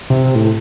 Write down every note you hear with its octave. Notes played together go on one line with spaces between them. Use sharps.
C3
A2